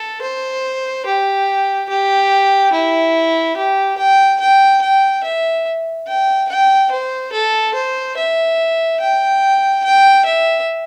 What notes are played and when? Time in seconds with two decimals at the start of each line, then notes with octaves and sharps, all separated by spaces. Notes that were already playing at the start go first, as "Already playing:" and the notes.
Already playing: A4
0.22 C5
1.06 G4
1.89 G4
2.73 E4
3.57 G4
3.98 G5
4.40 G5
4.82 G5
5.24 E5
6.07 G5
6.49 G5
6.91 C5
7.33 A4
7.75 C5
8.17 E5
9.00 G5
9.84 G5
10.25 E5